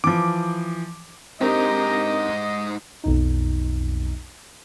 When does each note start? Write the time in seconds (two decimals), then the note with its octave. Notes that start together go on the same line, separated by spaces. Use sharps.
0.04 E3 F3 D6
1.41 G#2 C4 D4 D#4 G4 A#4 D#5 A#5
3.04 B1 F2 D#4